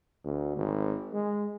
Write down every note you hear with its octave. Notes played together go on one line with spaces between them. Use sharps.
D2
G#1
G#3